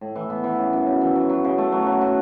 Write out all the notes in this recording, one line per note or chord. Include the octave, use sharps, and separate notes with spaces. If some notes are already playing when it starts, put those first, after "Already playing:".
A2
E3
B3
E3
C#3
F#2
C#3
E3
F#3
F#3
C#3
A3
F#3
F#3
F#4